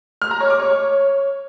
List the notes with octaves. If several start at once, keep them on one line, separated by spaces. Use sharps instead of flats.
F6
A#5
C#5
D6
C#5